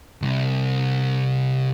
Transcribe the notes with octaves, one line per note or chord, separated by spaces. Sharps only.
C2 C3